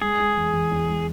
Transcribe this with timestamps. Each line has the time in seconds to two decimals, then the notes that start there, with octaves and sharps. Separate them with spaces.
0.02 G#3 G#4
0.19 G#3
0.37 E2
0.53 E2
0.72 E2
0.89 G#3